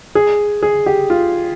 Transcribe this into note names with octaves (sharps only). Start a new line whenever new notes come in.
G#4
G#4
G4
F4